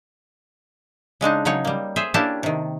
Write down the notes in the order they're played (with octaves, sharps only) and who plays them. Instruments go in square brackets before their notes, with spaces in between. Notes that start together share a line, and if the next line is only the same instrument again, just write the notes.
[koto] C#3 G#3 D4 D#4
C#3 F#3 D#4 C#5
G3 A#3
G#4 C5 E5
A#3 C#4 D4 E4 G4 A5
C3 D#3